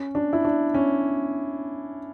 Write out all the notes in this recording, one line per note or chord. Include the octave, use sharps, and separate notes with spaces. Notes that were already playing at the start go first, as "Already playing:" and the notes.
Already playing: C#4
D4
E4
D4
C#4